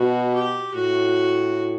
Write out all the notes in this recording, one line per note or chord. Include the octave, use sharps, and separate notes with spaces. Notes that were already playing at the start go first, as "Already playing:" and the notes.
Already playing: B2 F#4
G4
A2 F#4